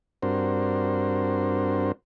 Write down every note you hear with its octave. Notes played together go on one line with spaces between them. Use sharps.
G2 C4 D4 F#4 A#4 C5